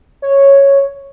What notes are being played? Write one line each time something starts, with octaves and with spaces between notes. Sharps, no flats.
C#5